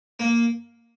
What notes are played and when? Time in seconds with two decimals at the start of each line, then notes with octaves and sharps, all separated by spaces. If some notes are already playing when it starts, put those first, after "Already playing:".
0.20 A#3